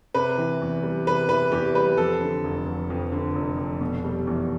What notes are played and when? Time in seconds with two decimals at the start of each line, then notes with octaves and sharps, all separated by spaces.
0.14 C3 B4
0.38 E3
0.61 E2
0.83 G3
1.07 C3 B4
1.29 E3 B4
1.52 E2 G4
1.75 G3 B4
1.97 F2 A4
2.21 D3
2.44 F1
2.66 F1
2.90 F2
3.12 D3
3.35 F1
3.58 F1
3.81 B2
4.04 G3
4.27 E2